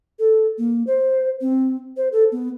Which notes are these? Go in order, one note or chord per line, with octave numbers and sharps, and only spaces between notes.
A4
A#3
C5
C4
C5
A4
B3